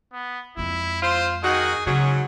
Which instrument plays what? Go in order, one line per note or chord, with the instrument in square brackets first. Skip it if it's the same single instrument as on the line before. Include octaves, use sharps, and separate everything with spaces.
[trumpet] B3
[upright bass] F2 G#3 [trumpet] E4
[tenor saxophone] F4 [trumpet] C5
[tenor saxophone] D#3 [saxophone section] D#4 F#4 [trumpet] G#4
[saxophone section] G#2 F#3 [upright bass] C#3 [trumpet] C#4 [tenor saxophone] G#4